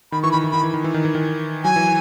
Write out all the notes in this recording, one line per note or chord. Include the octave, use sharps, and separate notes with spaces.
D#3 B5
E3 C#6
D#3 B5
E3
D#3 B5
E3
D#3
E3
D#3
E3
D#3
F#3 G#5
E3